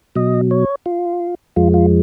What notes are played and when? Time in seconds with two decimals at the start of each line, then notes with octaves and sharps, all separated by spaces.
0.15 B2 F#3 D#5
0.51 C#5
0.86 F4
1.56 F2 F3 G#3 F4
1.74 F4